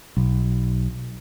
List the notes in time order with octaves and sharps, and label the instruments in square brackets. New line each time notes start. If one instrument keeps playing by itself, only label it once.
[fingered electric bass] B1